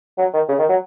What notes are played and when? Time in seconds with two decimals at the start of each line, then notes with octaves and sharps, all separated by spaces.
0.18 F#3
0.33 D#3
0.49 C#3
0.59 D#3
0.69 F#3